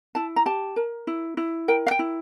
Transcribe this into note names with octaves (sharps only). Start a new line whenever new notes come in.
E4 A5
A#5
G4 A5
A#4
E4
E4
A#4 G5
F5
G5
E4